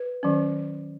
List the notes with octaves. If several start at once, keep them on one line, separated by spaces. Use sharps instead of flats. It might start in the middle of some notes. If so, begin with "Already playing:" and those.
Already playing: B4
D#3 F#3 C#4